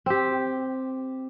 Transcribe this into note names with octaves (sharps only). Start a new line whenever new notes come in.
C4 G4